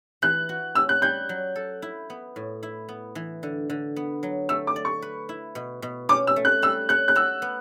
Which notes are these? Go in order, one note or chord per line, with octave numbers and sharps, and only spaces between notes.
E3 F#6
F#4
C#4 E6
F#6
G3 G6
F#3
A4
E4
B3
A2
E4
B3
E3
D3
D3
B3
F#3
A3 E6
D6
D5
C#6
B4
E4
B2
B2
C#4 D6
E6
A3
F#6
G3 E6
C#5 F#6
F#6
F#4 E6
B3